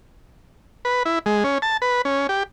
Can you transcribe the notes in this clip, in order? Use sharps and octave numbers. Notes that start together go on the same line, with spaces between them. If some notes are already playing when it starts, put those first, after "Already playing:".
B4
E4
G#3
C#4
A5
B4
C#4
G4